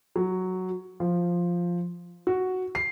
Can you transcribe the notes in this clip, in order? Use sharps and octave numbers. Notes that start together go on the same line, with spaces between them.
F#3
F3
F#4
C7